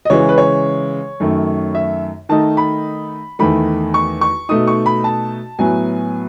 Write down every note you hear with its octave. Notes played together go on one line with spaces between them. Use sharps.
D#5
C#3 E3 G#3 C#5
B4
C#5
F#2 D#3 A3
E5
D#3 A3 D#4 A5
B5
E2 D#3 A3 B5
C#6
C#6
B2 A3 D#4 D#6
C#6
B5
A5
A2 F#3 B3 G#5